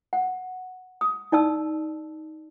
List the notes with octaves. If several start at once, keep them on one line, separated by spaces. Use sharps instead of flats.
F#5
D#6
D#4 D5 A5 E6